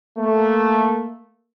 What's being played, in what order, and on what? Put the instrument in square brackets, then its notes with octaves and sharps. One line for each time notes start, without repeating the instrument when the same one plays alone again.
[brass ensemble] A3 A#3